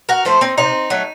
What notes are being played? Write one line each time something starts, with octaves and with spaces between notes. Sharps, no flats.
F#4 A#4
F3 A3 A4 C5
C4 D#4
C3 C4 D#4
F#3 A3